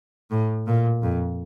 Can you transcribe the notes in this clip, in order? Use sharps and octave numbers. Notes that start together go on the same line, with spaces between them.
A2
A#2
F2